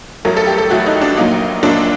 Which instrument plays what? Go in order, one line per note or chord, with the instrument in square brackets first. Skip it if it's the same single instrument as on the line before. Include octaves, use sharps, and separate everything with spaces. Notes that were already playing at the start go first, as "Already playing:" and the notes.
[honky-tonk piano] A1 G2 F#3 A3 A#4
A4
G4
A4
A1 G2 F#3 A3 F#4
D#4
D4
A#1 A#2 F#3 A#3 D#4
A#1 A#2 F#3 A#3 D4